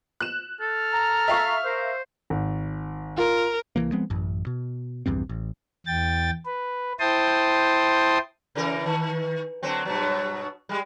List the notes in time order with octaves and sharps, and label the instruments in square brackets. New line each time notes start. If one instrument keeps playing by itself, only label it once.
[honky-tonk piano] F#6 E7
[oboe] A4 [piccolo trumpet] F6
[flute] A#5
[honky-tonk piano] E5 F5 C#6
[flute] A#4 [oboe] C5
[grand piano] G#1
[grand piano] F4 [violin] A#4
[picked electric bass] C2 F#2 E3 A#3
F3 G#3 B3 C4
A1 F#2
B2
A#1 E2 G2 C4
A1
[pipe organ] E2 G5 A6
B4
E4 C5 G5 A5 C6 D#6
[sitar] C#3 E3 A#4
D#3
D3 F#3 C4
G2 B2 F#3
G3 G#3